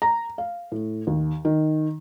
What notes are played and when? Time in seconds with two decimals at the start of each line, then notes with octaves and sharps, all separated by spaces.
0.02 A#5
0.38 F5
0.72 A2
1.07 D#2
1.45 D#3